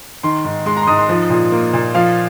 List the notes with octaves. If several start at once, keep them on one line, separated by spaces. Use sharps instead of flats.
D#3 C6
G#2
G#3 C6
A#5
C6
G#2 D#6
C6
F3
A#2
A#3
A#2
F3 F5